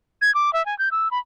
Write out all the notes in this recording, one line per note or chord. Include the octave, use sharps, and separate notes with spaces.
G#6
D6
E5
G#5
G6
E6
B5